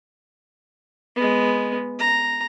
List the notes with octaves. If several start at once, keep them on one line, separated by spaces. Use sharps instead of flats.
G#3 B3
A#5